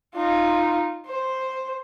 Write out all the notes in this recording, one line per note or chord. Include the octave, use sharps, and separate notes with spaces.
D#4 F4
C5